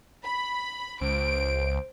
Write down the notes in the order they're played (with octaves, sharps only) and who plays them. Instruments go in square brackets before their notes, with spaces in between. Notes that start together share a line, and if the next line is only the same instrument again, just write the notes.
[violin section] B5
[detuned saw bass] C#2 [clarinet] C5 [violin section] D7